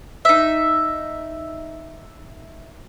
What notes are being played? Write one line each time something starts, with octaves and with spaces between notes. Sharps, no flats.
D#4 E5